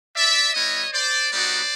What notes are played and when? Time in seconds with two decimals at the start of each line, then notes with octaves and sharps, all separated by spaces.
0.14 D5 E5
0.53 G3 B3 E4 C#5 D#5
0.93 C5 D5
1.32 G3 B3 D#4 F#4 C5 D5